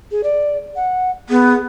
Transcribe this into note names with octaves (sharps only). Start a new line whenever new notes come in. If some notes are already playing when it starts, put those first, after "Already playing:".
G#4
D5
F#5
B3 G#4